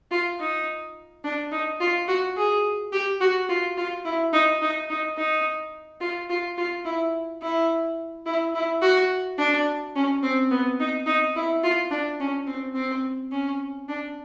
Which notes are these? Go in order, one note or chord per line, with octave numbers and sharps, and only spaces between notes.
F4
D#4
D4
D#4
F4
F#4
G#4
G4
F#4
F4
F4
E4
D#4
D#4
D#4
D#4
F4
F4
F4
E4
E4
E4
E4
F#4
D4
C#4
C4
B3
D#4
D#4
E4
F4
D4
C#4
C4
C4
C#4
D4